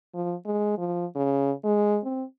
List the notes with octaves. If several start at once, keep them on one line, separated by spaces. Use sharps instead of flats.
F3
G#3
F3
C#3
G#3
C4